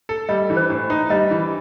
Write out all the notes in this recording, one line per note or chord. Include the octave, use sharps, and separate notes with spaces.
A4
G3 D#5
E3
C5
A2
D#4
G3 D#5
E3